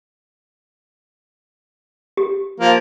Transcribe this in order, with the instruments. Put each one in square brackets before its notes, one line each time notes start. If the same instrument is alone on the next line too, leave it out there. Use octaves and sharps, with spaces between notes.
[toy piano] G4
[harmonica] F3 A#3